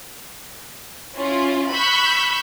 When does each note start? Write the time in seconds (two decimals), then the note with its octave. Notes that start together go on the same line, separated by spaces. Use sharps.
1.17 C#4 E4 F4
1.73 B5 C#6 E6 F#6 G6 B6